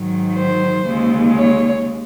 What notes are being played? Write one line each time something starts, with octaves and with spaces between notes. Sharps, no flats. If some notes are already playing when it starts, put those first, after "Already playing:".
Already playing: G#2 D#3 F#3
C5
D#2 C#3 G#3
C#5